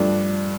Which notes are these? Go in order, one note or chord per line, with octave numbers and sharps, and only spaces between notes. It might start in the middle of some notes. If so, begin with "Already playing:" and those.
Already playing: G2 F3 A3 D4